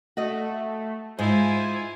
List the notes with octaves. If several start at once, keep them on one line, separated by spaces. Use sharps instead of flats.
A3 F#4 D#5
G#2 E4 F4 C5 G#5